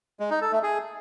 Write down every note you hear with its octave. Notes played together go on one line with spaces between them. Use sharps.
G#3
D#4
A4
A3
G#4